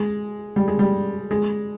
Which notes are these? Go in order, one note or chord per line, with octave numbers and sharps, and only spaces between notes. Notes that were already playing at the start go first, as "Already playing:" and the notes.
Already playing: G#3
G3
G#3
G3
G#3